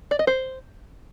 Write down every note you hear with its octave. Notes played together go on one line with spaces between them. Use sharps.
D5
D#5
C5